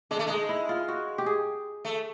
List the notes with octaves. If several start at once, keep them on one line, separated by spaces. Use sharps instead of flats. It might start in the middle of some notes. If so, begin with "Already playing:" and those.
G#3 D4
A3
G#3 D#4
E4
F4
F#4
G4
G#4
A3